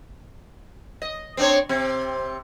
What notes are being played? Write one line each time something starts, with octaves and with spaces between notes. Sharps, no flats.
D#5
C4 D4 C#5
C3 C4